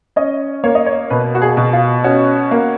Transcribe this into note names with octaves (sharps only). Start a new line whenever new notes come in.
C#4 D#5
A#3 C#5
D#5
C#5
B2 B4
F#4
G#4
B2
F4
C#4 F#4
A#3